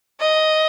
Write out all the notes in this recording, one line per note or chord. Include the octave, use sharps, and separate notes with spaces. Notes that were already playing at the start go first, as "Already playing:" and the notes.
D#5